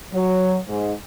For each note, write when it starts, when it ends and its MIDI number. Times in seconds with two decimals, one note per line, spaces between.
0.13 0.57 54
0.68 0.91 44